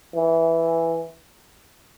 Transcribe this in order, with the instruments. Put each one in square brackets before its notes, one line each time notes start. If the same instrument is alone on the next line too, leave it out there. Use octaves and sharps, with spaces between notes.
[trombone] E3